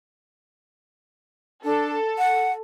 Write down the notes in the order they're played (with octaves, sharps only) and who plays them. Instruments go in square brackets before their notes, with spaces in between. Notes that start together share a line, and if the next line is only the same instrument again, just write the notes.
[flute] D4 [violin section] A4
[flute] F#5